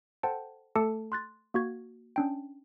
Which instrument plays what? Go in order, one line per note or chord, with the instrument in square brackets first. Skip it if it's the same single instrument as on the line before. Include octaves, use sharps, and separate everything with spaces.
[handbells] A4 C5 F#5 G5 A5
A3 A4 A5 D6 C#7
C6 F#6 A6
A#3 F#4 G#6
C#4 D4 G5